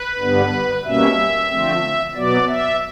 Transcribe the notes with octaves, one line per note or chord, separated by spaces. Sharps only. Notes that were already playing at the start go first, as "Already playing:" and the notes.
Already playing: B4
G2 D3 G3 B3
B2 G3 A#3 C#4 E5
D3 F3 A3 C4
B2 F#3 B3 D5
E5